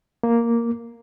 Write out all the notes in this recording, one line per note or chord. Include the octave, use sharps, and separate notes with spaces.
A#3